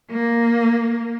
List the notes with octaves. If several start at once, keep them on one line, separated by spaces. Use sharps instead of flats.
A#3